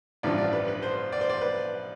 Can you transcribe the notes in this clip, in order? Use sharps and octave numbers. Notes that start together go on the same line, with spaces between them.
A1 G2 D3 F3 D5
D5
B4
B4
C5
D5
C5
D5
B4